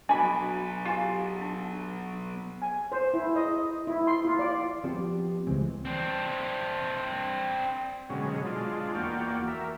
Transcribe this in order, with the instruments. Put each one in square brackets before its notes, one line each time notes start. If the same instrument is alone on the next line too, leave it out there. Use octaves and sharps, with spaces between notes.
[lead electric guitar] F#3 B3 [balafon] D4 F#4 [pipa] G#5 B5
[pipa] F4 [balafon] G4 F5 G#5
[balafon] D4
[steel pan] G#5
C5
E4
D#5
E4
C6
F4
D5
[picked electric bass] F3 B3 [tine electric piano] C4 G4
[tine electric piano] C#2 C#3 E3 [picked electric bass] G#3 C4
[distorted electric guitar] C4 D4
[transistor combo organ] B2 D3 F#3 G#3 C#4
G#3 D4 F4
E2 A#3 F#4 D5 G5 F6
A#4 E5